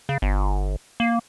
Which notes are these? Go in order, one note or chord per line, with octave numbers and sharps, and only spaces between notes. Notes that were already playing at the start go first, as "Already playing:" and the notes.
C#3
G1
A#3